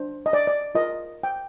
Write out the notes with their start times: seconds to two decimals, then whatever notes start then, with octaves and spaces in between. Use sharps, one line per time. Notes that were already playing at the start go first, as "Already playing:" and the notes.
Already playing: D4 C5
0.26 D#5
0.33 D5
0.47 D5
0.75 F4 A#4 D#5
1.23 G5